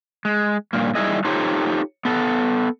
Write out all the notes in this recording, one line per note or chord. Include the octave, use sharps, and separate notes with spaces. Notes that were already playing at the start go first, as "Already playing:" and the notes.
G#3
G2 A#2 A#3
G3 D#4 E4 G#4 D#5
D#4 F4 G4 A4 C5 C#5
B3 A4